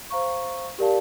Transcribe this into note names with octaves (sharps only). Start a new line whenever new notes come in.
C5 F5 A#5 C#6
G4 A#4 D5 F5 A5